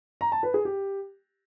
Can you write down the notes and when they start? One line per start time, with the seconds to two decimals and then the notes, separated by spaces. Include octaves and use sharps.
0.21 A#5
0.32 A5
0.43 B4
0.54 G#4
0.65 G4